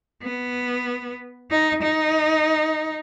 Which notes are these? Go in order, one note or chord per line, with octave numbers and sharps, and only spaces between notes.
B3
D#4
D#4